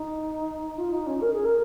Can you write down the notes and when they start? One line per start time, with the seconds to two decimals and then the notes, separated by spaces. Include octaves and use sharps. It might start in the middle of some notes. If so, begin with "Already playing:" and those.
Already playing: D#4
0.77 F4
0.91 D#4
1.06 C#4
1.20 A#4
1.32 G#4
1.44 A#4